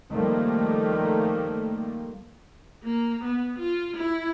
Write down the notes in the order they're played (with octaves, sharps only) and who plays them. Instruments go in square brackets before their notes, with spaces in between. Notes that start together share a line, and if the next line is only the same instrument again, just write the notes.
[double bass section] D#3 F3 G3 A3 A#3
[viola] A#3
B3
F4
E4